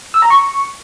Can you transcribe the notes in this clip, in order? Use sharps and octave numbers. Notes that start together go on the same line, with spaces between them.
E6
A#5
C#6